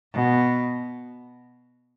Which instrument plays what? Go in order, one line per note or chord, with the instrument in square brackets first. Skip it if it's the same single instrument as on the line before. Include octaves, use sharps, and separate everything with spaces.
[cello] B2